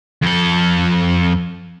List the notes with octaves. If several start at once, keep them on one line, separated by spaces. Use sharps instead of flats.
F2 A4